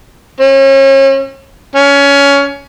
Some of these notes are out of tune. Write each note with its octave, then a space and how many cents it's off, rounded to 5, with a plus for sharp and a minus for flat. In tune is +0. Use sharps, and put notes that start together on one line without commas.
C#4 -35
C#4 +20